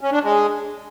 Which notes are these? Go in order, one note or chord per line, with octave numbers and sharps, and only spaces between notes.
C#4
D4
G#3